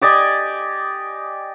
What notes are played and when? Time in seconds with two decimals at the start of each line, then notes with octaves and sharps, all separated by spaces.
0.02 G4 D5 D#5 G#5